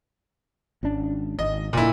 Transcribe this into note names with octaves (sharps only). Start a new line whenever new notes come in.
G#1 C#4 D4
G#1 D#5
F1 A#2 D3 E4